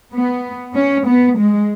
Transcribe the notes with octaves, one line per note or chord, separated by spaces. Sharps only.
B3
C#4
B3
G#3